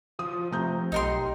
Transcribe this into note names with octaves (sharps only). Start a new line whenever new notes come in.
F3 F4 D#6
C3 A3 A#5 G6
B1 D#4 G4 A#4 C6